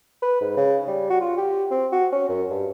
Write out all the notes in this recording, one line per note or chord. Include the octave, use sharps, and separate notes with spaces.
B4
G#2
C#3
G3
F#4
F4
G4
C4
F#4
C#4
F#2
G2